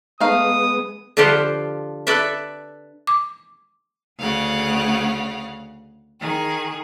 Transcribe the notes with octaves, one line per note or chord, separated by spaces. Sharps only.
G#3 A3 B3 D#4 F5 D#6
D3 F3 F4 G4 B4 C5
A4 B4 D5 E5
D6
D2 C#3 F5 F#5
D#3 G#4